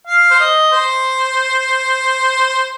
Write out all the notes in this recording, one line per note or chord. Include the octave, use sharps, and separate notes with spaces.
F5
C5
D#5
C5